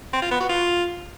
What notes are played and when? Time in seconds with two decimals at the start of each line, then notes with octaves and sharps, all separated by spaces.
0.13 C4
0.22 F4
0.31 B3
0.40 F#4
0.49 F4